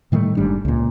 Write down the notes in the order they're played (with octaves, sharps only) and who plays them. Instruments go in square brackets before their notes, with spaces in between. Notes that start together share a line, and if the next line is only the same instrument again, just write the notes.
[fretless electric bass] A2 D#3 G3 A3
F#1 G#2 G3 D4
C#2 A#2